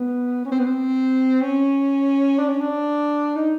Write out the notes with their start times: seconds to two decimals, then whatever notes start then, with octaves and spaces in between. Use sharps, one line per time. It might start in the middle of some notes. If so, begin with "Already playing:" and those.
Already playing: B3
0.45 C#4
0.52 C4
0.59 B3
0.66 C4
1.42 C#4
2.39 D4
2.49 C#4
2.61 D4
3.36 D#4